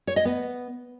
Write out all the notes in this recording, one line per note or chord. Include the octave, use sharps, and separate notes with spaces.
C#5
D#5
B3